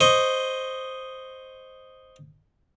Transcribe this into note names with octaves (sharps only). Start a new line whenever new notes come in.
C5 D#5 C#6